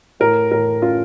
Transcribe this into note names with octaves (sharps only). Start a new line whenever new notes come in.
A2 A#4
A2 A#4
C#4 F4